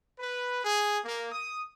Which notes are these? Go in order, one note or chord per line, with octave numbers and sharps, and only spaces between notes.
B4
G#4
A#3
D#6